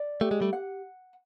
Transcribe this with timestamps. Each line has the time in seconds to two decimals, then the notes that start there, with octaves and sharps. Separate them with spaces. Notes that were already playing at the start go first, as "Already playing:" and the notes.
Already playing: D5
0.21 A3 G4
0.31 G#3
0.42 G3 A3
0.53 F#5